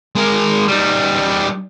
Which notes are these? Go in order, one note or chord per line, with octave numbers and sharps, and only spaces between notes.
G#3 A#4
G3 D#4